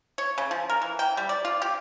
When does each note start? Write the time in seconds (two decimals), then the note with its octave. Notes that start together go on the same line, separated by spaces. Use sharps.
0.18 C#5
0.38 C#3
0.51 F3
0.70 A#4
0.82 E3
0.99 G5
1.17 G3
1.29 D5
1.45 F4
1.62 G4